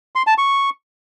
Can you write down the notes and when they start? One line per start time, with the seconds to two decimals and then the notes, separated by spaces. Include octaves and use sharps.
0.16 C6
0.27 A5
0.38 C#6